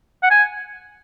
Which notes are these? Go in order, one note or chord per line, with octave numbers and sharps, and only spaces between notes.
F#5
G#5